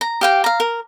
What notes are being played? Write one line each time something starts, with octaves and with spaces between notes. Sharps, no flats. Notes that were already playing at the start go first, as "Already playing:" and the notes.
A#5
G4 F5 G5
F5 A#5
A#4